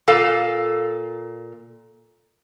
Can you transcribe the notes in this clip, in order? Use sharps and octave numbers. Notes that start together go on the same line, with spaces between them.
A#2 A4 F5